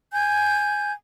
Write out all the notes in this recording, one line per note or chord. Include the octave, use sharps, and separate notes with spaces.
G#5 G6